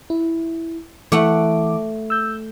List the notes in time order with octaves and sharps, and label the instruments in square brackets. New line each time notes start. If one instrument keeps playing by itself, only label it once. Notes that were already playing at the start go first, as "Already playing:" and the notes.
[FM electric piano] E4
[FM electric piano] E3 D6 [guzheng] A3 F#5
[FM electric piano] E6 G6